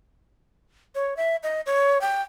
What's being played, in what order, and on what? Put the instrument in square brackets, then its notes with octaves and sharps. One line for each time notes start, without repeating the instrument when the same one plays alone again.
[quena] C#5
E5
D#5
C#5
G5